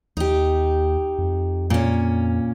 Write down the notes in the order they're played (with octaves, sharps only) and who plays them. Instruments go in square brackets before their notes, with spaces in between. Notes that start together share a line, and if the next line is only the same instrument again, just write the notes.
[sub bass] D#2 [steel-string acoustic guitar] D#4 G4
[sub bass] F2
[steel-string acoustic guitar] A#2 C#4